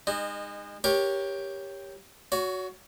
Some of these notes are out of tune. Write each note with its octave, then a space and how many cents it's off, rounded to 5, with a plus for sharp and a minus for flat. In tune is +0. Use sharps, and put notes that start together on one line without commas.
G#3 -35 D#4 -15
G4 +5 A#4 +25 C#5 +0
F#4 +0 C#5 +30